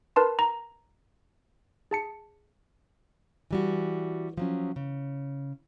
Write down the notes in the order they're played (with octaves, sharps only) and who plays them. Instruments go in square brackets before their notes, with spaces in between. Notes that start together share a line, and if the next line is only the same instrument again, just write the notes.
[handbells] A#4 B4 A5 C6
A#5
G#4 A5 C#7
[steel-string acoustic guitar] E3 G3 F#4
F3 F#3 C#4
C#3